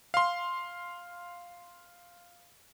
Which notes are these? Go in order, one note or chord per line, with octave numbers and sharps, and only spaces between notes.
F5 C6